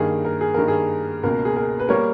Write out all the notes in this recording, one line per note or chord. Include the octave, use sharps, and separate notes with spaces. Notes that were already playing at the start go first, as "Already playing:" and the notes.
Already playing: G2 D#3 A#3 G#4
A#4
G#4
G2 D#3 A#3 A#4
G#4
C#2 B2 A#3 A#4
G#4
A#4
B4
G3 A#3 A#4 C#5